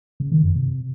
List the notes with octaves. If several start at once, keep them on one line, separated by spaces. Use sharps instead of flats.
C#3
D#3
F#2
C3